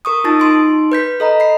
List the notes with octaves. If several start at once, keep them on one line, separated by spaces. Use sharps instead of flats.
A#4 C#6 D#6
D#4 F4 A5 D#6 A6
D#4 C6 D7
B4 G6 B6
A4 D#5 A#5 B5
B5 C7